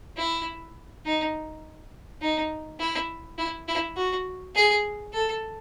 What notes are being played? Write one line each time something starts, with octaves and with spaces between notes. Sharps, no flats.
E4
D#4
D#4
E4
E4
E4
F#4
G#4
A4